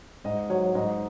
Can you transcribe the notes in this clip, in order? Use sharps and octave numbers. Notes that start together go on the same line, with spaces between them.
G#2 D#5
F#3 C#5
G#2 D#5